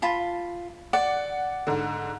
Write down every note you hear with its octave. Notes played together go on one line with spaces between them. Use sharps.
F4 A5 B5
D5 F#5
G#2 D3